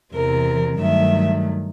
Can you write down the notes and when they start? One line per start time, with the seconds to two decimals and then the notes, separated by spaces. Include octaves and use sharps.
0.14 E2 C3 E3 A#4
0.79 G2 D#3 F#3 A3 E5